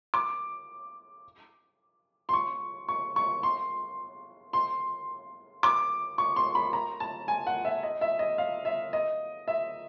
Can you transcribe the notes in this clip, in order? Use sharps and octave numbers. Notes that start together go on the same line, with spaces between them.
D6
C6
C#6
C#6
C#6
C6
C6
D6
C#6
C6
B5
A#5
A5
G#5
F#5
E5
D#5
E5
D#5
F5
E5
D#5
E5